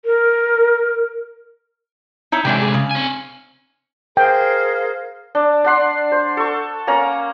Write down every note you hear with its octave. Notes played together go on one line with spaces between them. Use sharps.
A#4
D#4 E4 C#5
C3 E3 G#3 A3 D4 G4
G#4
C#3
C4 G#5
G#4 A#4 C5 F5 G5
D4
D4 F#5 C6
C5
A4 C#6
A#3 C#4 A#5